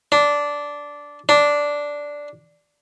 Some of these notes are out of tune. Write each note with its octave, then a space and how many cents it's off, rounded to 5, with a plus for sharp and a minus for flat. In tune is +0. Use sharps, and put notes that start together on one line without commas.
D4 -10
D4 -5